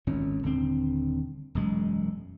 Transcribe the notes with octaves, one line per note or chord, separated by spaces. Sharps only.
G#1 A#2 C#4
D#1 D3 C4
E1 F#2 G#3